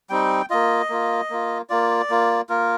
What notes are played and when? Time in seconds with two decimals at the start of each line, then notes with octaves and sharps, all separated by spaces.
0.10 G3 C4 D#4 G5
0.50 A#3 F4 D#5
0.89 A#3 F4
1.30 A#3 F4
1.70 A#3 F4 D5
2.10 A#3 F4
2.49 A#3 F4 A#4